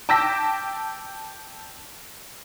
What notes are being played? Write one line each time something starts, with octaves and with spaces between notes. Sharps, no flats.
G5 A5 D6 E6 A#6 B6